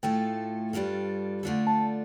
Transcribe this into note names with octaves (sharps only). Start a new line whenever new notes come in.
A2 A3 F4 A4 G5
G2 G3 D4 F4 A4
D3 A3 D4 F4 A4
A5